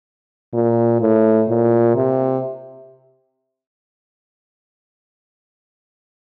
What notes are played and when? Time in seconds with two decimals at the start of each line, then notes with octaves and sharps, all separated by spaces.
0.53 A#2
1.01 A2
1.49 A#2
1.96 C3